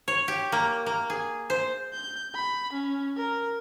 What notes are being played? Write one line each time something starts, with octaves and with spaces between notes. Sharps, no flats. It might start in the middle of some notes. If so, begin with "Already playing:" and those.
C#5
G4
A#3
A#3
G#4
C5
G6
B5
C#4
A#4